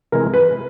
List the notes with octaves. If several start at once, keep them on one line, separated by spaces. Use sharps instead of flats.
C3 E3 G#3 A#4
B4